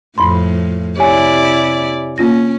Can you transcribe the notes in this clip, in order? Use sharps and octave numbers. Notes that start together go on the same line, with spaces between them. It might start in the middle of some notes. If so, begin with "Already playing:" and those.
F2 A2 F3 B5 C6
C3 E4 G4 C#5 D5 G#5
A#3 C#4 F4 A#6